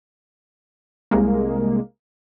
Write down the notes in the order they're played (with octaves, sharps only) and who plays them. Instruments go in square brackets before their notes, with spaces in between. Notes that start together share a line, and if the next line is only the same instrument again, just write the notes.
[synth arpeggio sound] C2 G#3 A#3